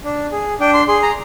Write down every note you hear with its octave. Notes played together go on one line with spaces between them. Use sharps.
D4
G#4
D4 G5
C6
G#4 C6
A#5